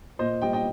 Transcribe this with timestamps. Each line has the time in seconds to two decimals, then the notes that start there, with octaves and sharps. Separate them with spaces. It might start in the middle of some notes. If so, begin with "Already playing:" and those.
0.19 A#2 C5 D#5
0.42 G3 D#5 G5
0.53 D#5 G5